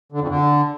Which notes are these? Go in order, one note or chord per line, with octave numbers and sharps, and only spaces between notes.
D3
F2
D3